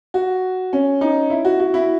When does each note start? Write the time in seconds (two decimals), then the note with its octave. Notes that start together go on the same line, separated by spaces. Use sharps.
0.14 F#4
0.73 C#4
1.01 D#4
1.30 E4
1.45 F#4
1.60 F#4
1.74 E4